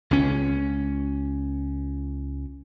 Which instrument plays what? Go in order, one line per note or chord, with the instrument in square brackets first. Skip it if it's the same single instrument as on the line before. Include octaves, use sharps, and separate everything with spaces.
[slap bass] C#2 C#4